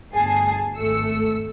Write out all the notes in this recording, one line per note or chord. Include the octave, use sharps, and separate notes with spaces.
G1 D2 G#4 G#5 A5 C7
G#1 A3 E6 C#7